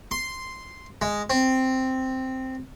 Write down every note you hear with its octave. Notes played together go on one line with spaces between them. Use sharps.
C6
G#3
C4